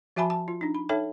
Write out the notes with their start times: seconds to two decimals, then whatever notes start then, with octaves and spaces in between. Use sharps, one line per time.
0.16 F3 F#4 E5 G#5 A5 B5
0.30 A5
0.48 F4
0.61 D4 D#4
0.75 B5
0.89 D#4 A4 C#5 E5 G5 A5